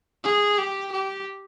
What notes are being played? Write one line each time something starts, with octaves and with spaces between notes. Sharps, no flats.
G#4
G4
G4